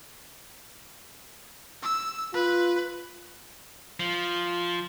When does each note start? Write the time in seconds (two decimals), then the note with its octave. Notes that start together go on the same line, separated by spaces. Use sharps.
1.82 E6
2.34 F4 B4
3.99 F3